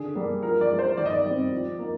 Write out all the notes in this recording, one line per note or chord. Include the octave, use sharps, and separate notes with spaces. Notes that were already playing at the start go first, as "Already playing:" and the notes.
Already playing: D3 G#4
G3 A#3 D4
F3 A#4
D5
G#3 D4
C5
D#3 D5
D#5
D5
G3 C4
F3
A#3 D#4